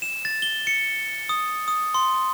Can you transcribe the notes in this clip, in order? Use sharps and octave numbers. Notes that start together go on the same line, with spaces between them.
E7
A6
G7
C#7
D#6
D#6
C6